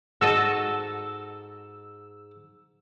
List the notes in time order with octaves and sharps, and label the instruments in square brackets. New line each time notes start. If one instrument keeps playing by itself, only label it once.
[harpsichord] G#2 A5 [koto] F#4 A4 D#5 [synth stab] E6